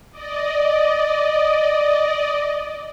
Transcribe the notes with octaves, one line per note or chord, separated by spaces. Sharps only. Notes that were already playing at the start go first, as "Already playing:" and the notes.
D5 D#5